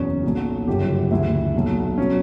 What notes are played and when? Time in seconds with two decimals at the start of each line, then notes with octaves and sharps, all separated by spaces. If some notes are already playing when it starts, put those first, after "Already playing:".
Already playing: F#1 E2 B2 F#3 C#4
0.23 B1 A#2 F#3
0.67 G1 F#2 C#3 G4
1.11 D2 C#3 E3 E4
1.55 B1 A#2 F#3
1.98 B2 F#3 C#4